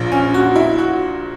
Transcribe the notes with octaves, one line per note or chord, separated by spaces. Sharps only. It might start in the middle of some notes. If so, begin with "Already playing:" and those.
Already playing: A#1 A#2
C#4
F#4
E4
F#4